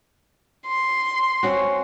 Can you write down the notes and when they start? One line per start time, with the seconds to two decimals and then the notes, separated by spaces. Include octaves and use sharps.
0.67 C6
1.43 C4 C#4 F#4